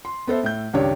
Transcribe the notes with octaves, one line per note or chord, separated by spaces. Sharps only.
C6
B3 A4 C5 E5
A2 E5 G6
C#2 G2 D#3 D4 G4 C#5